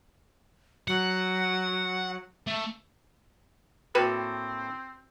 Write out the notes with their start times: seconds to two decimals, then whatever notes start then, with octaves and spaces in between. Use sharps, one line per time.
0.88 F#3 F#5
2.47 A3
3.95 A2 A#3 C4 F#4 A4 B4 G5